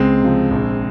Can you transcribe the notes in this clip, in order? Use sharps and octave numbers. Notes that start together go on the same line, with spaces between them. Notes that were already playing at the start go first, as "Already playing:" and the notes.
Already playing: C#2 G#3 C4
C3 F3
A#1